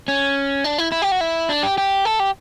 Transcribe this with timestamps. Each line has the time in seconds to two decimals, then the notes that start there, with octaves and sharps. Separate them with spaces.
0.08 C#4
0.64 D4
0.78 E4
0.92 E4
1.02 G4
1.12 F#4
1.21 E4
1.49 D4
1.63 G4
1.78 G4
2.05 A4
2.20 G4